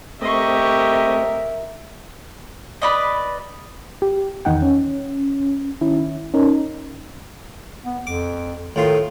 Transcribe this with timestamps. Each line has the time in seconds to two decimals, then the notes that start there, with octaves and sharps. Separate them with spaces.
0.21 A3 C4 G4 A#4 D#5 E5 C#6
2.82 B4 D5 D#5
4.02 G4
4.45 E2 D#3 D#4 F#5 G5
4.62 C#4
5.81 D#3 C#4 E4
6.34 C#4 D#4 A#4
7.85 B3
8.07 F2 D6
8.76 A2 D#3 F4 C6